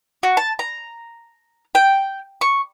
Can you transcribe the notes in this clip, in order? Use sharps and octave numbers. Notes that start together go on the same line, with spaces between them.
F#4
A5
A#5
G5
C#6